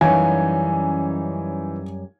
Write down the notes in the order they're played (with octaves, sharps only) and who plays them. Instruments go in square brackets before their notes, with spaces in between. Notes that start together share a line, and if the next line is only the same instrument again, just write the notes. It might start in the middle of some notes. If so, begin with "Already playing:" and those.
[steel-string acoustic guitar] F#2 G3 C#4 [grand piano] E3 D#4 [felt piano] C#5 F5 G#5